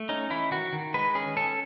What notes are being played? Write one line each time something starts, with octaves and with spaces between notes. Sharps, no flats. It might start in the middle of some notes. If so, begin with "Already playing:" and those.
Already playing: A3
C#4 D#4
E3 E4
D#3 F#4
D#3
G#3 B4
C#4 G#4
C#4 A4